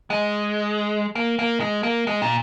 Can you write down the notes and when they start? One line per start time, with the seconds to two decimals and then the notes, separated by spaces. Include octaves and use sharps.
0.10 G#3
1.15 A#3
1.39 A#3
1.60 G#3
1.83 A#3
2.07 G#3
2.22 A#2